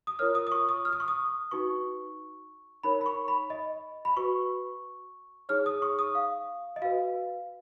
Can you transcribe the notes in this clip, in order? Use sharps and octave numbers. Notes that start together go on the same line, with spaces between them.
D#6
F4 A#4 C#5 F6
D#6
D#6
C#6
D#6
F6
D#6
C#6
D#6
D#4 F#4 B4 C#6
D#4 A#4 C#5 B5
B5
C#6
B5
D#5
B5
F#4 B4 C#6
D#4 G#4 C#5 F6
D#6
C#6
D#6
F5
D#5
F#4 B4 F5